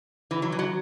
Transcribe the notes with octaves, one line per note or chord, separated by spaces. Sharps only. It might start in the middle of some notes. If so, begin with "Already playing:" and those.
E3
F#3
E3
F#3